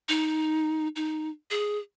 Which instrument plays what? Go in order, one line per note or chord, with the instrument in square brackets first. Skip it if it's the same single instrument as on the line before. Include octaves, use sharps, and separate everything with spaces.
[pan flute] D#4
D#4
G#4